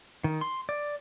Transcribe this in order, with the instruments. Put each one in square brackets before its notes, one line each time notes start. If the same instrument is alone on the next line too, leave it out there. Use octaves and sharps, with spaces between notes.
[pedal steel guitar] D#3
C6
D5